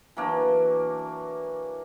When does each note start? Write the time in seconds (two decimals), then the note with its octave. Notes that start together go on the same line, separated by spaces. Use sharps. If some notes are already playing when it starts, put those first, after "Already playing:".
0.17 E3 F#3 A#3 D4